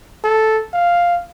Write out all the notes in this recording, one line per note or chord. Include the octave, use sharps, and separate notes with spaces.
A4
F5